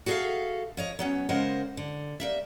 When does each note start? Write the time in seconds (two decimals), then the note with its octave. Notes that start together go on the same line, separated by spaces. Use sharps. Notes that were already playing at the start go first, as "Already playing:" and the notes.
0.06 F#4 G#4 A4 D5 E5 F5
0.77 F3 C#5 D#5
0.99 F#3 B3 C#4
1.29 C#3 G#3 A#4 C5 D#5 F#5
1.77 D3
2.20 G3 A#3 E5